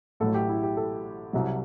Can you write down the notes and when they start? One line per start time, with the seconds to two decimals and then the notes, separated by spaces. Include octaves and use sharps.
0.20 A1 A2 F#3 A4
0.34 G4
0.49 E4
0.63 G4
0.77 A4
1.33 C2 C3 F#3